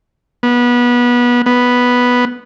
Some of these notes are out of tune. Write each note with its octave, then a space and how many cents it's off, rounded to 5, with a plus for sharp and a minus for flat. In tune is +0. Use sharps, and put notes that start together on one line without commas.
B3 -25
B3 -5